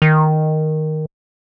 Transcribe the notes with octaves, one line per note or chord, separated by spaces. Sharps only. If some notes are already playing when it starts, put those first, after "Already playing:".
D#3